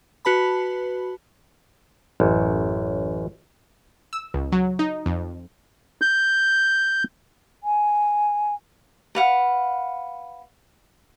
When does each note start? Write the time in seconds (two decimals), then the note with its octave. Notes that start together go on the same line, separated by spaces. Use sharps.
0.25 F#4 B4 A5 B5
2.20 A1 F#2
4.13 E6
4.34 C#2
4.52 F#3
4.79 D#4
5.06 F2
6.02 G6
7.64 G#5
9.15 B4 F5 F#5